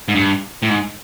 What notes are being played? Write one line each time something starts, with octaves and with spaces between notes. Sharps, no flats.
G#2
G2
A2
G#2